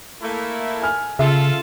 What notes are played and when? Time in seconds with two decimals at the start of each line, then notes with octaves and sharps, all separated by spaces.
0.22 A3 A#3 E4
0.83 G#5 F6
1.19 C#3 F4 A4 E5